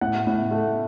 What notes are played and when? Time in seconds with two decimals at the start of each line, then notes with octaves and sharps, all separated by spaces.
0.01 A2 F#5
0.27 A2
0.51 A3